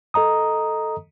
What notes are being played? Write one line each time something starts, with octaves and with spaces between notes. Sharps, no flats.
A4 D#5 A#5 D#6